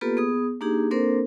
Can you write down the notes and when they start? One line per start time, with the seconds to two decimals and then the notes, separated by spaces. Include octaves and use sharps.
0.01 A#3 B3 F4 G4 A4 B4
0.17 B3 G#4 D#6
0.61 A#3 D4 D#4 G4 G#4
0.91 A#3 C4 D4 A4 A#4 C5